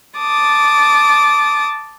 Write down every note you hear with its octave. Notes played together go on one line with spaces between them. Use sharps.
A5 D6 D#6